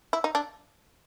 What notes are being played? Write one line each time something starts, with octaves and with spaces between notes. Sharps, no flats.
E4
D#4
D4